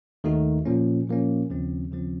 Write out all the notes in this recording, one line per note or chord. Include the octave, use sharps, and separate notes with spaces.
D#2 D#3 A3 D#4 F#4
A#2 F3 A#3 C#4
A#2 F3 A#3 C#4
D#2 C#3 F3 C4
D#2 C#3 F3 C4